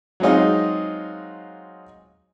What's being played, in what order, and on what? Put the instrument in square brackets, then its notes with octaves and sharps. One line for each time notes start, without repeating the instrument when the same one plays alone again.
[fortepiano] F#3 G#3 C4 D#4 F4